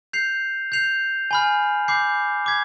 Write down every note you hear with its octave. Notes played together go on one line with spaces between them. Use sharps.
G6 C7 F7
G6 C7 F7
G#5 B5 F6
B5 D6 G6 C7
D6 G#6 B6